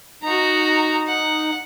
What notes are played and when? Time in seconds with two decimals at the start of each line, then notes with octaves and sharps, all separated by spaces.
0.23 D#4 F#4 A#5
1.07 F#5